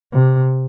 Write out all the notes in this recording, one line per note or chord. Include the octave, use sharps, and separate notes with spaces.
C3